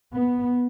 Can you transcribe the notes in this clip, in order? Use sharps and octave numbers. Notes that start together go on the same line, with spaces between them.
B3